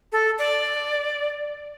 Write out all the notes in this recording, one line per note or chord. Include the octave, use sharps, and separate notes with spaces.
A4
D5